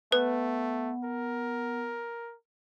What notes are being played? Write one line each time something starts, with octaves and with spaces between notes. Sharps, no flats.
A3 B3 B4 F#5
A#4